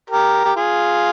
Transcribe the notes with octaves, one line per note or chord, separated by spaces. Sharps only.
G4 A#4
G4
F4 G#4